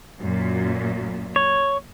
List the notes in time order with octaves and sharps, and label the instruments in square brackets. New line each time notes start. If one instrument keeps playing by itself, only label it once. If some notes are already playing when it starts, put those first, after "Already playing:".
[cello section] F#2 A#2
[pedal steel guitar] C#5